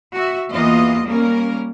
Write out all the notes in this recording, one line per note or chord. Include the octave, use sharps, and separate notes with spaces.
F#4 E5
E2 E3 A#3 F4 F#4 D#5
G3 A#3 C#4 A#4